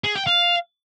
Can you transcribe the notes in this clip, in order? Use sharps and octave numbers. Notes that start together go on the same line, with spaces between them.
G#4
G5
F5